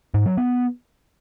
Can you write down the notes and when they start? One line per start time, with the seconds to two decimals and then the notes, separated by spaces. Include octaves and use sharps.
0.14 G#2
0.26 F#3
0.37 B3